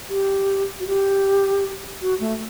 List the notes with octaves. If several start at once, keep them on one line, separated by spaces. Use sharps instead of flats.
G4
F#4
G4
F#4
A3